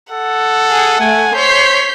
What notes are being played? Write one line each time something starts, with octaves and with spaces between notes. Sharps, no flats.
A4 F#5
G#4
A3 G#5
C5 C#5 G6 B6 C7